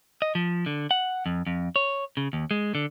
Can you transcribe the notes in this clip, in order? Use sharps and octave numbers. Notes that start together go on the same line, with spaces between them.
D#5
F3
D3
F#5
F2
F2
C#5
C#3
D#2
G#3
D3